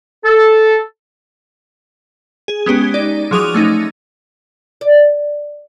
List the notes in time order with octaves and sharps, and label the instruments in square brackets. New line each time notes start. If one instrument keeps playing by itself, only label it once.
[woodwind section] A4
[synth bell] G#4
G#3 B3 C#4 G4
D#4 D5
F3 F#3 G#4 D6 D#6 F7
A3 C#4 D#4
[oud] D5